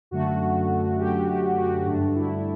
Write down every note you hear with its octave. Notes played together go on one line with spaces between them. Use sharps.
F#2 D3 F#3 A3 F#4
F#2 D3 F#3 A3 G4
G4
F#4
G2 D3 A3 D4
E4